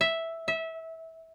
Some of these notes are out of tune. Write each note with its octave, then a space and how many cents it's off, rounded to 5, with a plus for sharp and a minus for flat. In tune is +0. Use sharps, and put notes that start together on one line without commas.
E5 -5
E5 -20